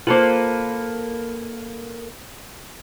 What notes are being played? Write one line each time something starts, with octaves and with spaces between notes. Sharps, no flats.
A#3 F4 A4 B4 C5